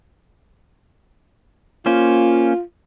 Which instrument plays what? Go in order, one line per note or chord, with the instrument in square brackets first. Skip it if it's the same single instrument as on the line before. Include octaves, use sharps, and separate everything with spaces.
[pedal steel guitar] A#3 C#4 C5 [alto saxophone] F4